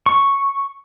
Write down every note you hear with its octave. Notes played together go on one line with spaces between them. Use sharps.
C#6